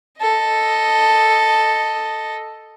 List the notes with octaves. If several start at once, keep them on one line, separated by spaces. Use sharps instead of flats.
A4 D#5